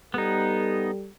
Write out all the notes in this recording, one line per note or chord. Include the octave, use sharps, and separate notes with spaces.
G3 B3 D#4 A4